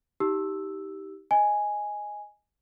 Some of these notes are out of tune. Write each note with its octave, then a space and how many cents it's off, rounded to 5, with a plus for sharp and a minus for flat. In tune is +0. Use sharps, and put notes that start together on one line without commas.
D#4 +25 G4 -10 E6 +0
D#5 +0 G#5 +0